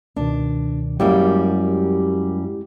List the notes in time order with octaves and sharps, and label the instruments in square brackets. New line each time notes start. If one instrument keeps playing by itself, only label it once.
[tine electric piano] C#2 B2 D#3 [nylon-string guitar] D4
[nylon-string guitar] F#2 G3 A#3 [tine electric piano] G#3 E4 G4